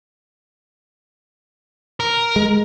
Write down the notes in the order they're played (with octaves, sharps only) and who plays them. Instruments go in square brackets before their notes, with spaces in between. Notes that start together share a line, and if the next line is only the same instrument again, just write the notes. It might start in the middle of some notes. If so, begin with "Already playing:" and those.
[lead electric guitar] A#4
[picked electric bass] G#3